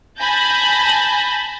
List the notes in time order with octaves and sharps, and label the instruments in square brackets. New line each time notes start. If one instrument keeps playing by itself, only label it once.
[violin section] G#5 A5 B5 G6 A6 A#6